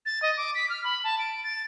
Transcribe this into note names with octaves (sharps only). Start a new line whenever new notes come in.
A6
D#5
D6
B6
F6
B5
A5
D7
A6